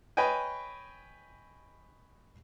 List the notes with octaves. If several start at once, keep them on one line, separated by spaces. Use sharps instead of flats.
B4 C#5 D#5 G5 G#5